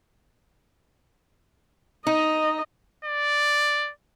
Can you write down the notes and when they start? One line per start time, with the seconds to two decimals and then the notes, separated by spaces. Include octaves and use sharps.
2.07 D#4 D#5
3.04 D5